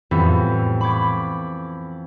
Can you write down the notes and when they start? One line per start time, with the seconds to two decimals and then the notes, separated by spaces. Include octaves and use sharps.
0.11 F2 A2 E3 G3 B3 E4
0.81 B5 C#6 D6 G#6